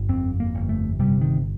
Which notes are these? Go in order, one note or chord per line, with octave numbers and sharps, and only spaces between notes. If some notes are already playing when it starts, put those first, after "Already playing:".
Already playing: G1
F2 C4
A#3
G1
A3
C3 G3
D#3